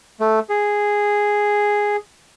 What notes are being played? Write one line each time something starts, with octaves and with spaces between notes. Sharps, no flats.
A3
G#4